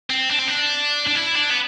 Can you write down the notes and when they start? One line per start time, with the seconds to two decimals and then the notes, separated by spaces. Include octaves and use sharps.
0.10 C4
0.31 D4
0.39 C4
0.48 D4
1.07 D4
1.15 E4
1.35 D4
1.50 B3